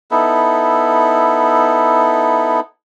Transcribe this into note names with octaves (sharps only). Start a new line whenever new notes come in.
B3 D#4 E4 A4